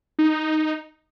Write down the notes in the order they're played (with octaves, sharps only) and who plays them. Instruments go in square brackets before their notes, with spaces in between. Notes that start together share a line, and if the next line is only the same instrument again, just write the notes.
[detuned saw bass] D#4